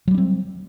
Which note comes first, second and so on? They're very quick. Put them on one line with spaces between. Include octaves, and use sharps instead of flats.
F#3 G3 C#4 C4